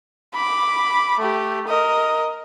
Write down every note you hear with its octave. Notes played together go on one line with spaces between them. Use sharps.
B5 D6
A3 G4
A#4 D#5